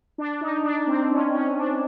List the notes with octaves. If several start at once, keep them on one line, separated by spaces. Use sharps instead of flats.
D4
D#4
D4
C4
C#4
C#4
D4